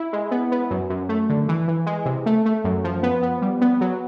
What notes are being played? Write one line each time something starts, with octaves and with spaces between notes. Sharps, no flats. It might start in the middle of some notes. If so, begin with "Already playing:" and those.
Already playing: E4
G#3
B3
B3
F#2
F#2
A3
D3
E3
E3
G#3
C3
A3
A3
F#2
F3
B3
B3
G3
B3
F#3